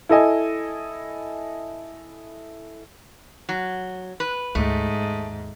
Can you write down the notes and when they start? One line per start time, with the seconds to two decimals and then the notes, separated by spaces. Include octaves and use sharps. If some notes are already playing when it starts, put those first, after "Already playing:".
0.09 E4 A4 D#5 G#5
3.49 F#3
4.20 B4
4.55 D2 G#2 A3
5.01 D#2